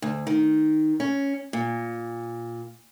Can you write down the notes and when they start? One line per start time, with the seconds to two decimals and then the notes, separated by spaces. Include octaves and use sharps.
0.02 D2
0.27 D#3
1.00 C#4
1.53 A#2